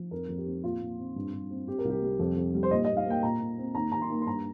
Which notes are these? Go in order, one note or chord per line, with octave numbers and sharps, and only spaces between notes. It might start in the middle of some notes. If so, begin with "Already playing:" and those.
Already playing: F3
F2 A#4
F2
G4
C4
A#2 F4
A#2
C4
G2
G2
C4
C4 G4
A#4
C2
G4
G3
F2
F2
G3
C5
A#2 D#5
A#2 D#5
F5
A#3 G5
A#2 A#5
A#2
C4
D#2 A#5
D#2 A#5
C6
A#3
C6
G2 A#5